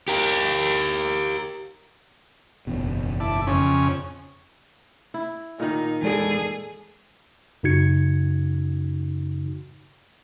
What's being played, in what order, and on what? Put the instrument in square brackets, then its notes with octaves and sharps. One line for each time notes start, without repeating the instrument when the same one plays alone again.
[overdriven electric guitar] G4 A#4
[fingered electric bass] F#1 E2 B2
[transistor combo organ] E4 A5 D6
F2 C#3 C#4
[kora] E4
[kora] A#2 D#3 [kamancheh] D#4
[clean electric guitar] E2 G#3 D5 [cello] G#4 [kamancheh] A4
[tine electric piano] F#2 C#3 D#4 F#4 G#6 C#7